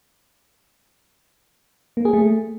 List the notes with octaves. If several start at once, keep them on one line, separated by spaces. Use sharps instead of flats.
A#3
G#4
A3